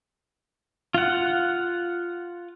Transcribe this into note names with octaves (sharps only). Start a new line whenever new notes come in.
F4 F#5